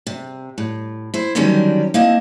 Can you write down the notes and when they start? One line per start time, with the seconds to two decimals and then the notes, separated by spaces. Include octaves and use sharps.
0.07 C3
0.58 A2
1.14 E4 C5
1.35 D3 D#3 F#3 G3 C#4 A#4
1.94 A#3 C4 E4 D#5 A5